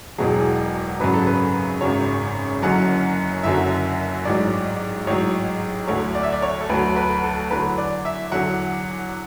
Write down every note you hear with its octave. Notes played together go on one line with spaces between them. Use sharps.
E1 E2 B2 F#3 G#4
G#1 F#2 C#3 F#3 B4
A4
B4
G#1 F#2 C#3 F#3 C#5
F#1 F#2 D3 F#3 F#5
F#1 F#2 D3 F#3 E5
A1 G#2 F#3 D5
A1 G#2 F#3 C#5
D2 D3 F#3 C#5
D5
E5
D5
C#5
A4
D2 D3 F#3 B4
B4
A4
E2 D3 F#3 B4
D5
E5
E2 D3 F#3 F#5